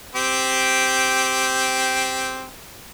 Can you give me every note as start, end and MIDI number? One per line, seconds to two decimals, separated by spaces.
0.15 2.49 60
0.15 2.49 67